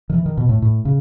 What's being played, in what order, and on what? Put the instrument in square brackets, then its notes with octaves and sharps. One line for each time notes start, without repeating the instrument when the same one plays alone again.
[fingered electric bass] D#3
E3
D#3
B2
A2
A2
C#3